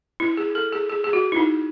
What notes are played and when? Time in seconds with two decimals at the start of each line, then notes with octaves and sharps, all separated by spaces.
0.20 E4
0.37 G#4
0.55 A4
0.72 G#4
0.89 G#4
1.04 G#4
1.13 F#4
1.32 E4
1.36 D#4